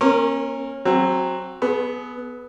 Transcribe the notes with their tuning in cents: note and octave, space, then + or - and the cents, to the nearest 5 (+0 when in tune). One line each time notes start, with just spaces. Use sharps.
A#3 +30 C#4 -25 A#4 -10
F#3 +0 C4 +20
B3 +0 G#4 +45